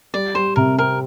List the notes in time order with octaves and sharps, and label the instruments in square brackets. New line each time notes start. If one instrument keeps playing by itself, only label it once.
[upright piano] G3 [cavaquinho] D5
[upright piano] G3 [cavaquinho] C5
[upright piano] C3 [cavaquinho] A#4
[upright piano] C4 [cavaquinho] A#4